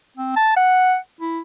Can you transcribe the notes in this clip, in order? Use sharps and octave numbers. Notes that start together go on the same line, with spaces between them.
C4
A5
F#5
E4